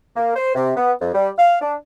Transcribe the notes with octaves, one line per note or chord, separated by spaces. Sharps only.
A#3
C5
C3
B3
F2
G3
F5
D4